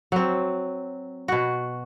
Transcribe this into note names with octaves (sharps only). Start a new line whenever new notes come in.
F#3 C4
B2 F#4